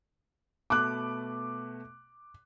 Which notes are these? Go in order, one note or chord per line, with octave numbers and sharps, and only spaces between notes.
B2 A3 B3 D6 F#6